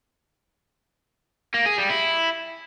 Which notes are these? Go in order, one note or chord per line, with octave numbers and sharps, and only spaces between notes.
A#3
G#4
G3
E4